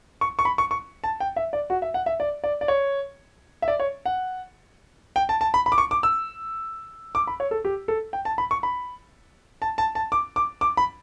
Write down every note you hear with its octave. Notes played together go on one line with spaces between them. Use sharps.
C#6
C#6
B5
C#6
C#6
A5
G5
E5
D5
F#4
E5
F#5
E5
D5
D5
D5
C#5
E5
D5
C#5
F#5
G5
A5
A5
B5
B5
D6
C#6
D6
E6
D6
B5
C#5
A4
G4
A4
G5
A5
B5
C#6
B5
A5
A5
A5
D6
D6
D6
B5